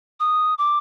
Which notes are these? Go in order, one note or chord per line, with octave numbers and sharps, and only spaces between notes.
D#6
D6